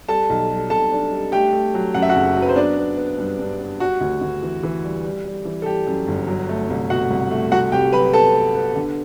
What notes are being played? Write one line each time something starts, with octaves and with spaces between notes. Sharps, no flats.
G3 A4 A5
B1
G3
B1 A4 A5
D4
G3
A3 G4 G5
A3
F#3
F#2 F#5
E5
F#4 F#5
F#1
F#3
B4
C5
B3 D4 D5
B3
B3
G2
G2
B3
G3 F#4
D2
D2
E3
E3
G3
G3
G3
E3
A4
G3 G4
F#2
G1
F#3
A3
C2
B2 F#4 F#5
C2
A3
C2 F#4 F#5
C2 G4 G5
F#3 B4 B5
B3 A4 A5
B3
B3
D3